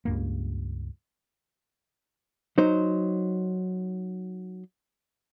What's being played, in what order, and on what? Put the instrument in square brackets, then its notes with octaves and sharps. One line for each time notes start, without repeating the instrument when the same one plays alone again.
[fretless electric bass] C#2 G2 A#3
[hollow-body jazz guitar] F#3 D#4 C5